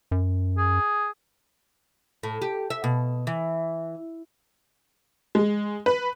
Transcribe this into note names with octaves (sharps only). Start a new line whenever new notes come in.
F#2
G#4
A2
G4
E5
B2
E3
G#3
B4